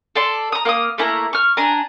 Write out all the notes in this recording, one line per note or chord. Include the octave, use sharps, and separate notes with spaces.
A4 D5 C6
A#5 D#6
A#3 F5 C#6 D#6
A3 A#3 E4 A#5
C#6 F6
D4 G#5 A#5